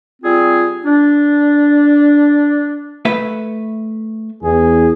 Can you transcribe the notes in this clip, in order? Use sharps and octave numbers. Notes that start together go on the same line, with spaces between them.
G3 C4 F4 G#4
D4
A3 B4 E5
E2 G#4